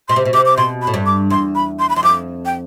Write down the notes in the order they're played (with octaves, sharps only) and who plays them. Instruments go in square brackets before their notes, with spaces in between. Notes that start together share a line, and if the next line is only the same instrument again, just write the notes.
[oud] B2 [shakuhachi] C6
[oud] C3
B2
[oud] C3 [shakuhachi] D6
[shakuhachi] D6
[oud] B2 [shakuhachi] C6
[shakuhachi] B5
[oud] A2
G2
[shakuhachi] D6
[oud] E2 [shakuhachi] C6
[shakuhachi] B5
C6
B5
[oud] E2 [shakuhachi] C6
[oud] F2 [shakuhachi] D6
[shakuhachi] G5